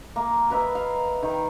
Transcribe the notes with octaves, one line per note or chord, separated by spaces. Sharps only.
A#3
A#4 B4 D#5 E5
F5
D#3 G5